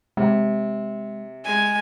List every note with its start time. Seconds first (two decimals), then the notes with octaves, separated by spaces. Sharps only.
0.17 C3 G#3
1.45 G#3 G#5